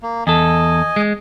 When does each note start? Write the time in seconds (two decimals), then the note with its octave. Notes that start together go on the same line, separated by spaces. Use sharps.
0.02 A#3
0.27 E2 A4 D#5 G#5
0.96 G#3